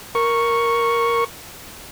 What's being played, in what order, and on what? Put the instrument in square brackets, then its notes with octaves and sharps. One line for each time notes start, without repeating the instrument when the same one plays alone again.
[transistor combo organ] A#4 C#6